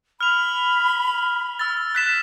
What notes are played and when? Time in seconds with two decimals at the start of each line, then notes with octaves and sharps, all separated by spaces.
0.21 B5 F6 F7
1.59 E6 A6
1.95 F#6 B6 E7